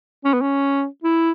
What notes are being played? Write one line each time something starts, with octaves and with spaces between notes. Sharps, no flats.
C#4
B3
C#4
E4